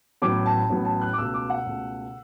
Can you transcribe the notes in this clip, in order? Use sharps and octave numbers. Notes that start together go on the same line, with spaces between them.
A1 A2 F#3 B3 D6
A5
A1 A2 F#3 B3
A5
F#6
D6
C#2 B2 A3 E6
D6
F#5
C#2 B2 A3